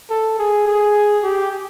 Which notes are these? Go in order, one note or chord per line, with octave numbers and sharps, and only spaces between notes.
A4
G#4
G#4
G4